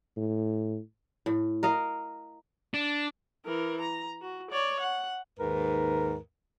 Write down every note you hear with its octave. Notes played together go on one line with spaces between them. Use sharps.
A2
A2
A#4 D#5 F5
D4
E3 A#4
A#5
F#4
C#5 D5
F#5
D#2 G#2 A#4 B4